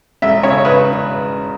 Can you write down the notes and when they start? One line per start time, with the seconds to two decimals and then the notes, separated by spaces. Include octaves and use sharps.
0.22 E1 E5
0.43 C#3 C#5
0.65 C#3 B4